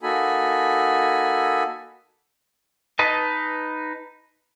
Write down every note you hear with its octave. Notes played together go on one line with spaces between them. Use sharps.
A#3 D#4 F#4 A4 G#5 B5
D#4 B4 D#5 A5